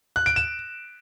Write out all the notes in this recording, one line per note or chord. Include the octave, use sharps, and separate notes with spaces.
F#6
D7
E7